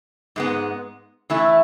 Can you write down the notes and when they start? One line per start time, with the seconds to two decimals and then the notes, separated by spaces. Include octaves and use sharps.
0.36 G#2 G#3 B3
1.30 E3 A3 E4